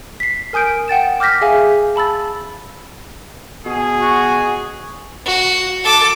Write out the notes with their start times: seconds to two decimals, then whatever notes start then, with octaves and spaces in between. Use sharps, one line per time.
0.20 B6 C7
0.53 A#4 G#5 D#6 G6 D7
0.88 F#5 G5 A6 E7
1.20 D6 F6 G6 A#6 B6
1.41 G#4 E5 F5 G#5
1.96 A5 B5 E6 A6
3.65 B2 G#4
4.01 F#4
5.25 F#4
5.84 A4 D6